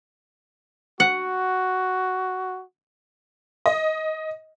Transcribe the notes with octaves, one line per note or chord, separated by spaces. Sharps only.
F#4 F#5
D#5